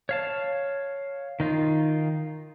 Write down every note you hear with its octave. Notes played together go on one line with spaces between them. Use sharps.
C#5 F5 A5
D#3 D#4 F4